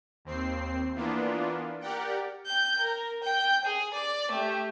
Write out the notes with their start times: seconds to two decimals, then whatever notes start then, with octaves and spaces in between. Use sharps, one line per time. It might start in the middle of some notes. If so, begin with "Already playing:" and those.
0.25 D#2 C4 C7
0.95 E3 A#3 B3 D4 F4
1.81 G4 A#4 D5 F#5 G5
2.46 G5 G6
2.79 A#4
3.23 G5 G6
3.65 G#4
3.94 D5
4.31 A3 G4